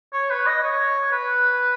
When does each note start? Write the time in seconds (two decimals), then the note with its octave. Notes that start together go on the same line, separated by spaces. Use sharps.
0.13 C#5
0.30 B4
0.46 D#5
0.62 C#5
1.11 B4